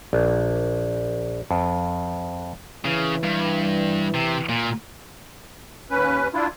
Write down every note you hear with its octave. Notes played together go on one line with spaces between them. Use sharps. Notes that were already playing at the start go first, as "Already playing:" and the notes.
A#1
F2
C#3 E3
G2
C3
A#2
D#2 C#4 B4
D4 E4 F4